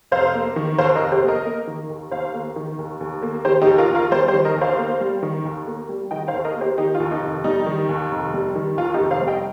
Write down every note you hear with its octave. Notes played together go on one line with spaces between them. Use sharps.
F1 C5 F5
A#3
D#3
D#2 C5 F5
A#4 D#5
F1
G4 C5
A#3
A#4 D#5
A#3
D#3
D#2
D#2 C5 F5
A#3
D#3
D#2
D#2
A#3
D#3 G4 C5
D#4 G4
D#2
F4 A#4
D#2
F4 A#4
G3 G4 C5
G4 C5
D#3
A#4 D#5
D#2
C5 F5
A#3
G3
D#3
D#2
A#3
G3
D#3 D#5 G5
C5 F5
D#2
A#4 D#5
A#3
G4 C5
D#3 D#4 G4
F4
D#2
D#4
F1
G3 D#4
D#3
D#2
F1
G3
D#3
D#2 F4
D#4 G4
F1
C5 F5
G3
D#5 G5